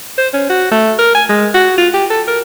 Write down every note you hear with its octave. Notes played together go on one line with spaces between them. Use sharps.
C5
C#4
F#4
A3
A#4
G#5
G#3
F#4
F4
G4
A4
A#4